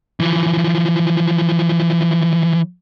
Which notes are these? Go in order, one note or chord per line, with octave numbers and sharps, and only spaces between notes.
E3 F3